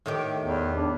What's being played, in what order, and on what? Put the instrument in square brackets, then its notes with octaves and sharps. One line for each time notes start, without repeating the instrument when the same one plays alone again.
[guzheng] A2 D#3 G4
[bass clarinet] E2
D4